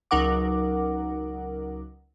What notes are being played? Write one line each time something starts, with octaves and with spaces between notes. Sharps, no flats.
C#2 F#3 D#4 A#4 F#5 D6